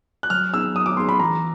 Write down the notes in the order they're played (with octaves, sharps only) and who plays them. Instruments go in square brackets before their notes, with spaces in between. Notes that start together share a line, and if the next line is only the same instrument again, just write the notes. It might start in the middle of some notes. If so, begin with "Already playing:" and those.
[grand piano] F#6
[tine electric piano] F#3 [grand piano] F6
[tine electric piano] B3 D#4 G#4 [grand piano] E6
[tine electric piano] F#3 [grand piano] D#6
[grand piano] D6
[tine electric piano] B3 D#4 G#4 [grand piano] C6
[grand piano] B5
[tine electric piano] E3 [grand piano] A#5